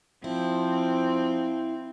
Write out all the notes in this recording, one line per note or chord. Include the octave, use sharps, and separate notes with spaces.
F3 C4 E4